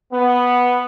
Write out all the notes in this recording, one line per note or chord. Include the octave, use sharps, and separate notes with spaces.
B3